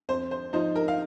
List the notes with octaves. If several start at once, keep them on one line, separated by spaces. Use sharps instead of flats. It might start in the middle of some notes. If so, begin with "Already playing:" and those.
F2 C5
C5
F3 D#4 C5
A#4
F5